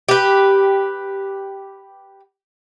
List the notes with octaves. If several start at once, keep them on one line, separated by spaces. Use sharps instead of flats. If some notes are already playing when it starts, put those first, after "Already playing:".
G4 B4